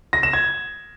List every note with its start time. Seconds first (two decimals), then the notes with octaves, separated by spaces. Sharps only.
0.13 A#6
0.23 E7
0.33 G#6